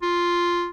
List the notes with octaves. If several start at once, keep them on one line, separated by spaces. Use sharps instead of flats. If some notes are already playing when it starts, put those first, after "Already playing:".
F4